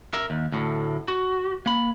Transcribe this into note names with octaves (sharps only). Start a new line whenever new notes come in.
A#4 E5
D#2
D2 A2
F#4
A#3 B5